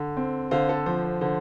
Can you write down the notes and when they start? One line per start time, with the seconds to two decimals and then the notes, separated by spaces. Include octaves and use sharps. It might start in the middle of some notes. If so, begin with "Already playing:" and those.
Already playing: D3
0.17 C4
0.51 D3 C5 F5
0.69 A4
0.86 F3 C5
1.05 C5
1.21 D3 C5